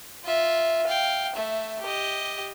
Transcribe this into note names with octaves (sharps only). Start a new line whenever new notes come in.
F4 E5
F5 G5
A3 E5
G4 D#5